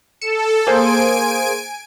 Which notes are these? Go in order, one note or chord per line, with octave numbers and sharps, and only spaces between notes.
A4 C#7 E7
A#3 G#4 C5 G#5 D7